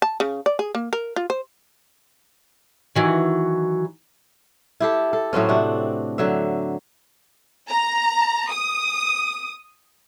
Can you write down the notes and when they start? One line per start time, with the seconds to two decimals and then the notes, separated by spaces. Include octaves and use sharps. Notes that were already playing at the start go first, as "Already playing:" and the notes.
0.02 A5
0.20 C#3
0.46 D5
0.59 G#4
0.75 A#3
0.93 A#4
1.16 F4
1.30 C5
2.95 D#3 E3 F#3
4.80 E4 G4 A4
5.13 A4
5.33 A2 F#3 C4 C#4
5.49 C3 D4 F#4
6.18 D3 F#3 E5
7.70 A#5
8.51 D#6